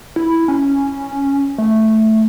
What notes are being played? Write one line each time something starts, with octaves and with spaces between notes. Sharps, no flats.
E4
C#4
A3